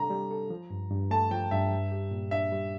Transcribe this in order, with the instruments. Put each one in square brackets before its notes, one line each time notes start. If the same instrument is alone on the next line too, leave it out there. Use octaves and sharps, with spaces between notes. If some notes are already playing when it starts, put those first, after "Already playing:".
Already playing: [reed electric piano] C3 G3 D4 A4 [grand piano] A#5
[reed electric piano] G3
A4
F3
G2
G2
[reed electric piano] A3 [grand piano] A5
[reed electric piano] F3 [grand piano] G5
[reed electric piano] G2 [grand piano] E5
[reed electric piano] G3
G4
A#2
[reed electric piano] D4 [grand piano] E5
[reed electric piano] G3